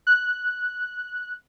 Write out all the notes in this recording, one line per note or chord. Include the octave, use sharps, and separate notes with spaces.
F#6